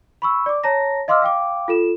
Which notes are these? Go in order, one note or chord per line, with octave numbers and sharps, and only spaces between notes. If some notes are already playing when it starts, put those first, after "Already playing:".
B5 C#6 E6
D5 D6
C#5 A5 A#5 A#6
D#5 F5 C6 D6 E6 F6
F5 G5 D6
F4 A4 E7